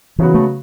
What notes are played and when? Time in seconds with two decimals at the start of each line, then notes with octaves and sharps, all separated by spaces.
0.18 C#3 E3 F#3 B3 F#4 B4
0.34 A3